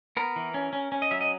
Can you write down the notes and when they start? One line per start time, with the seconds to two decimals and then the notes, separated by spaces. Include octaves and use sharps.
0.17 B3 A#4
0.36 E3
0.54 C#4
0.73 C#4
0.92 C#4
1.02 D#5
1.11 F#3 E5
1.21 D#5